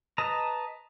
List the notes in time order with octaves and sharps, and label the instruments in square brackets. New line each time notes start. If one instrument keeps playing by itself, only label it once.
[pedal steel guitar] B4 D#5 A5 A#5